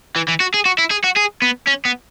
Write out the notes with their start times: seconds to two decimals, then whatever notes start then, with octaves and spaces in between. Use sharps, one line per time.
0.16 E3
0.28 E3
0.40 F#4
0.54 G#4
0.66 F#4
0.78 E4
0.91 G#4
1.04 F#4
1.17 G#4
1.42 B3
1.67 C#4
1.85 B3